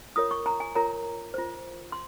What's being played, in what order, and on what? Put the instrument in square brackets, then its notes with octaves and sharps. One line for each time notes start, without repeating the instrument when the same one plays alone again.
[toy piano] F4 A#4 C#5 D#6
C#6
A#5
G#5
F4 A#4 C#5 A#5
F4 C5
C6